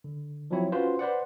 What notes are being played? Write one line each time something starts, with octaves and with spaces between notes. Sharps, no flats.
D3
F3 F#3 C4 E4 C#5
C#4 F4 F#4 B4 C5
B4 C5 D5 F#5